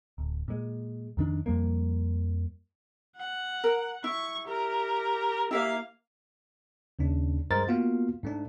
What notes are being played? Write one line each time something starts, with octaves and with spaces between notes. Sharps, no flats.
D1
A#2 G#3
F2 D#3 D4
F2 F3 G3 A#3
F#5
A#4
E4 C#6
G4 A#4
A#3 E4 G4 E5 F5
D#2 C#3 D4
G2 G#3 A#4 C5 D#5 A6
A#3 B3 F4 F#4 F5
G#2 A3 D4